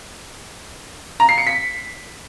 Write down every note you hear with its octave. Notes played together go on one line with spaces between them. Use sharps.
A#5
C7
C#7
B6